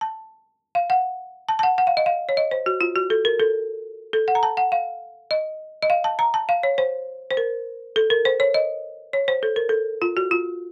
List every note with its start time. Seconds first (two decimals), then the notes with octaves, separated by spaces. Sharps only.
0.01 A5
0.75 F5
0.90 F#5
1.49 A5
1.59 A5
1.63 F#5
1.78 F#5
1.87 F5
1.97 D#5
2.06 F5
2.29 C#5
2.37 D#5
2.51 C5
2.66 F#4
2.81 F4
2.96 F#4
3.10 A4
3.25 A#4
3.40 A4
4.13 A4
4.28 F#5
4.35 A#5
4.43 A5
4.57 F#5
4.72 F5
5.31 D#5
5.83 D#5
5.90 F5
6.04 A5
6.19 A#5
6.34 A5
6.49 F5
6.63 C#5
6.78 C5
7.31 C5
7.37 A#4
7.96 A4
8.10 A#4
8.25 C5
8.40 C#5
8.54 D#5
9.13 C#5
9.28 C5
9.43 A4
9.56 A#4
9.69 A4
10.02 F4
10.17 F#4
10.31 F4